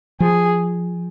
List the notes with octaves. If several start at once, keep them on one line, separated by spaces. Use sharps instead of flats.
F3 G#4